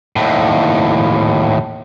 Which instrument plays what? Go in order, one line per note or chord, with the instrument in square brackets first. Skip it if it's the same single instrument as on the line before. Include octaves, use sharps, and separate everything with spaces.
[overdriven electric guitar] D#2 A2